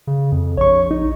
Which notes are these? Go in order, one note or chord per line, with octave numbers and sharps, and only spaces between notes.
C#3
F2
A#1 C#5 C#6
D#4